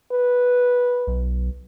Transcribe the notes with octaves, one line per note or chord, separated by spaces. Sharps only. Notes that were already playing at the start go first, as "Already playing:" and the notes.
B4
B1